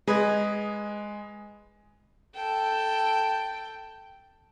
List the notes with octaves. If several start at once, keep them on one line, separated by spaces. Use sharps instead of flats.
G#3 G#4 B4 D#5
A4 G5